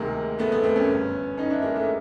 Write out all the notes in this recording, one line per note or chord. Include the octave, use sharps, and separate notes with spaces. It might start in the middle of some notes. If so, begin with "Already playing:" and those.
Already playing: D2 C3 D#3 G#3 A#3
A3 B3
A3 B3
A#3 C4
B3 C#4
G1 G2 D3
C#4 D#4
D4 E4
G#3 A#3
A3